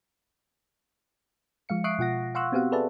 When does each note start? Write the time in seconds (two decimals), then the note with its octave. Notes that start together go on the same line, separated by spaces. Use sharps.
1.69 F3 G#3 F5 C#7
1.84 E5 C#6 D#6 F#6 C7 D7
1.99 B2 F4 F#5 A#6
2.35 F5 F#5 C6 C#6 E6 F#6
2.52 B3 C4 F#4 G4 F5 F#5
2.72 G#4 A4 B4 D5 E5 A5